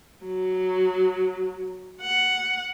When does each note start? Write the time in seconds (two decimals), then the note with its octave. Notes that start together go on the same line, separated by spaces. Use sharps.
0.24 F#3
2.01 F#5